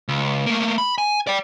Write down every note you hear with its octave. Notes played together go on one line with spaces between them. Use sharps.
C#2
A3 A#3
B5
G#5
D5 G5